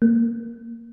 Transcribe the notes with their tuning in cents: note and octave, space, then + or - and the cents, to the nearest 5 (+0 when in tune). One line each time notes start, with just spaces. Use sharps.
A#3 -10